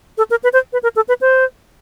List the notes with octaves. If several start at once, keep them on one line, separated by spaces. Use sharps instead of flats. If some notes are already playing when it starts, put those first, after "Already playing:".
A4
A#4
B4
C5
B4
A#4
A4
B4
C5